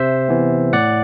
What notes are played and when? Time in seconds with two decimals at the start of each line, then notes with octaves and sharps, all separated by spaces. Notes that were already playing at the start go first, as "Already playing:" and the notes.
Already playing: C3 C5 E5
0.29 E3 B3
0.73 A2 D5 F#5